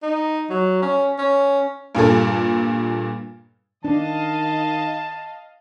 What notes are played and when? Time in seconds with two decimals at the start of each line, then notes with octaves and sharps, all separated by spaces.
0.02 D#4
0.50 F#3
0.82 C#4
1.18 C#4
1.95 G2 A#2 G#4 A4
3.85 D#3 D4 D#5 F5 A5